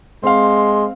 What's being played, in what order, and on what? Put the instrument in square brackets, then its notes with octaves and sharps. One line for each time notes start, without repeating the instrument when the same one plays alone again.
[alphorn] G#3 [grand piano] C4 F5 [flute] C6